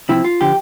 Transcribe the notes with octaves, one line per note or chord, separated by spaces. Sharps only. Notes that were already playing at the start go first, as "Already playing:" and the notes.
C3 F3 C4 E4
F4
D3 F3 G4